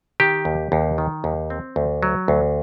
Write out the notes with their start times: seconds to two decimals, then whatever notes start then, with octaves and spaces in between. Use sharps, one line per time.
0.20 D#3 G4
0.45 D#2
0.72 D#2
0.98 D#3
1.24 D#2
1.50 C4
1.76 D2
2.03 F#3
2.28 D2